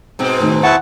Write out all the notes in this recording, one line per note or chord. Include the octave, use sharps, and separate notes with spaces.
G#2 B2 C4
A2 D#3
E4 F#5 A5 C#6 F#6